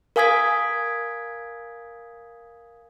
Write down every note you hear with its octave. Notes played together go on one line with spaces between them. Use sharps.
A#4 F5 G#5 D#6 G#6 B6